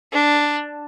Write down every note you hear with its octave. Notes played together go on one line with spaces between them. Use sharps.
D4